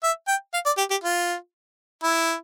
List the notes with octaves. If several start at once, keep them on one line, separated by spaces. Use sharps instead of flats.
E5
G5
F5
D5
G4
G4
F4
E4